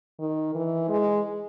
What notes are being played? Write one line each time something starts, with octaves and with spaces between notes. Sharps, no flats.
D#3
E3
G#3